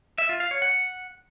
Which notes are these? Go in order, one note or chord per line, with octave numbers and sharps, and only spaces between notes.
E5
F4
F5
C#5
F#5